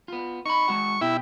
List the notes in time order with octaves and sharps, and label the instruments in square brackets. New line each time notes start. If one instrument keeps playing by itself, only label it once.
[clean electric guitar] B3 F4
[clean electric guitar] D#4 B5 [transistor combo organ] C#6
[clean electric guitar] G#3 F#4 F#5
[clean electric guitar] B2 G4 G5 [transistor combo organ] E4